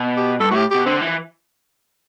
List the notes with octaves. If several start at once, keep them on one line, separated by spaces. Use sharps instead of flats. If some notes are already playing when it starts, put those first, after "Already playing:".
Already playing: B2
G4
G2 A4
A2 F#4 G4
B2 G4
D3 C4
E3